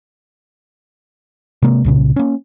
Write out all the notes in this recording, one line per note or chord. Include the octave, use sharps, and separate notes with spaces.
C3 G#3 A#3
C2 A#2 C#3
A#3 C#4